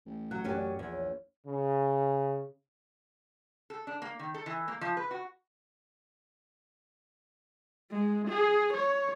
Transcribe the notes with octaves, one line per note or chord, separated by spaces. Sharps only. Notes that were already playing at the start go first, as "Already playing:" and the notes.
A1
F#3 F#6
F#2 C#4 G4
D5
A#1 E2
C#5
C#3
A4
D4
A#3
D#3
A4
E3
A#3
F3
B4
F#4
G#3
G#4
C#5